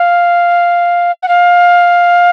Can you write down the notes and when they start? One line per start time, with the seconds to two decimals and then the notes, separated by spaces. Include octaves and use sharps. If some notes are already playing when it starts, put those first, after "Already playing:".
Already playing: F5
1.23 F#5
1.28 F5